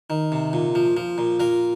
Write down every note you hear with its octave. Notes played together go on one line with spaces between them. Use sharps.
D#3
C3
A#2
F3
F3
A#2
A#2 A#4